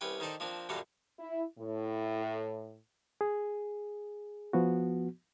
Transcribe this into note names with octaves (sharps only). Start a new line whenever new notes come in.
C2 C#4 B4 G5
D#3 D#4 A4 C5 D5
F3 A#3 C4 D4
F#2 A#2 F#3 G3 A4 F5
E4
A2
G#4
F3 B3 F#4